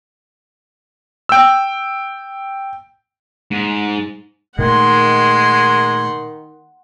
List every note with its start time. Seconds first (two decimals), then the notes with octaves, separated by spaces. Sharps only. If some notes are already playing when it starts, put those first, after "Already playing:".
1.29 G5 E6
3.51 G#2
4.58 A#2 D#3 G#3 A3 F#5 C6